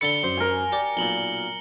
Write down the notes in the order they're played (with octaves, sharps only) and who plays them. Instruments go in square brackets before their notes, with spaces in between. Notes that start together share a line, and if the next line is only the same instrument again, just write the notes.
[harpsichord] D3 A4 B5 [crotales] C#7 G7
[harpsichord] F#2 C5
[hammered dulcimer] A#4 G#5
[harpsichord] G4 D5
[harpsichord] B1 A#2 [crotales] F#7 G7